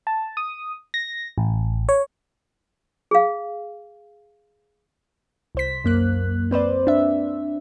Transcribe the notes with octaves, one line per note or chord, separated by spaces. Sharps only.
A5
D#6
A#6
A1
C#5
G#4 F5
C2 C5 B6
F#2 A#3 F#6
C4 B4 C5 D5
D4 E5